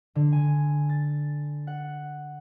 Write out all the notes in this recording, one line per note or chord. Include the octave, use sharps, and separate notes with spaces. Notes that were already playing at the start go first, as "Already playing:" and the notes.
D3
G#5
A6
F#5